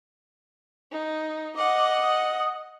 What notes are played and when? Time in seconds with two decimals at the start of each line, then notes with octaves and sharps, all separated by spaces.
0.92 D#4
1.56 D#5 F#5 D6
2.01 D#6